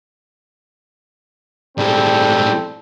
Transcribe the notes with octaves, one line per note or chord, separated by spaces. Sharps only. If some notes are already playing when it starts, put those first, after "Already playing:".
A2 G3 G#3 C4 A4 G5